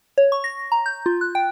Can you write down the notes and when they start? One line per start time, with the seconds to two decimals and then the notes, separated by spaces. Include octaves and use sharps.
0.18 C#5
0.32 C#6
0.44 A#6
0.72 A#5
0.86 G6
1.06 F4
1.21 F#6
1.35 G5